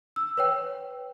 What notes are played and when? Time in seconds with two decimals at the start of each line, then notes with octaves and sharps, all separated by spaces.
0.16 E6
0.37 B4 C#5 G5